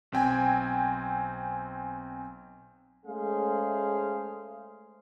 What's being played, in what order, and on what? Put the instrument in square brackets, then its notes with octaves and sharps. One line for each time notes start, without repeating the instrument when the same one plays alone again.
[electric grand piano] B1 C4 G5 G#5
[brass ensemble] G#3 A3 C#4 G#4 C5 F5